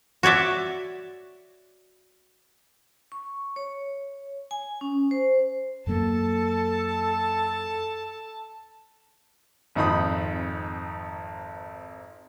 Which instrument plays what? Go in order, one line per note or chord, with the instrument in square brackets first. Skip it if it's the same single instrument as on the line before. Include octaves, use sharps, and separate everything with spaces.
[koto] F#4 C#5 D5 E5
[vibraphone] C#6
C#5
G#5
C#4
C5
[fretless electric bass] F#2 F#3 A#3 [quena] A4 [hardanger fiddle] A5
[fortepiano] G#1 F2 D#4 B5 D#6